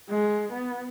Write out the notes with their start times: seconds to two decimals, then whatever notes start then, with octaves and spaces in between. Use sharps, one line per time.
0.10 G#3
0.53 B3